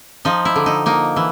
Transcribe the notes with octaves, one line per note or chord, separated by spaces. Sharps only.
F3 D#4
E4
D3
D#4
A#3 D#4
E3